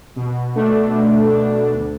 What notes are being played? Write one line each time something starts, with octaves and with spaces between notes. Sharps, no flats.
B2
A3 D4
B2
A3 D4
D2